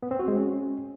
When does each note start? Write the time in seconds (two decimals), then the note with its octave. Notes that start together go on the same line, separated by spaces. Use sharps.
0.03 B3
0.11 C4
0.19 F#4
0.28 G#3
0.36 C#4